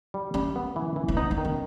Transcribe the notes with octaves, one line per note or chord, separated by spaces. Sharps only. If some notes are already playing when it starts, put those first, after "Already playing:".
G3
G3 C#4
B3
E3
E3
C#4
B3 D#4
C#4
D#3
B3